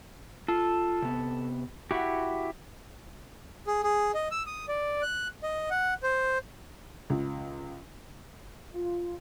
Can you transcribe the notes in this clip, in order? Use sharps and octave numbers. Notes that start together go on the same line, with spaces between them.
F4 A4
C3 B3
E4 F#4 G4 F#5
G#4
G#4
D#5
E6
D#6
D5
F#6
D#5
F#5
C5
C#2
F4